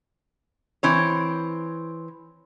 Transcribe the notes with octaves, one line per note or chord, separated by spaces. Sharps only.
E3 C4 C#5